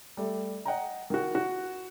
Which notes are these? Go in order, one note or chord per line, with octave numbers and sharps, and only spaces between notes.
G3 A3
D#5 F#5 G5 A#5
D#3 F#4
F#4